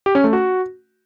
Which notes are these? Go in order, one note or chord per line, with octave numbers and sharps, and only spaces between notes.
G4
C#4
A3
F#4